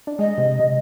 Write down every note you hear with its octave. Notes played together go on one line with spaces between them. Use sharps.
D4
G#3 D#5
C3
C3